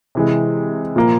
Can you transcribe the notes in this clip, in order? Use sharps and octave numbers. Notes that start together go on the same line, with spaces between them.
C3 E3 G#3
A#2 F3 A#3